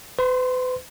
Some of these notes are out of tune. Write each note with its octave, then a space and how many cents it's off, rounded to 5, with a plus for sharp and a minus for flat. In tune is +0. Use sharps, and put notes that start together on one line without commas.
B4 +40 C6 +0